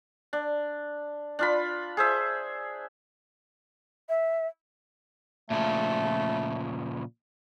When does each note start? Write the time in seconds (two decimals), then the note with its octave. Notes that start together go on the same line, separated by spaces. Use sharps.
0.33 D4
1.39 D4 F4 B5
1.97 G#4 C5 E5
4.09 E5
5.50 A#2 C#3 F3 A3